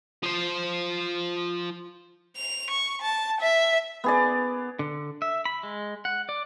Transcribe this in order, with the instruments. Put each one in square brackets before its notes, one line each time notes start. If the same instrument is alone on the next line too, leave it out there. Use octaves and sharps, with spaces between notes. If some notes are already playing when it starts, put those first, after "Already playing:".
[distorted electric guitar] F3 C5
[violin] F7
C#6
A5
E5
[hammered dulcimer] B3 G#4 D5
[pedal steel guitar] D3
E5
B5
G#3
F#5
D5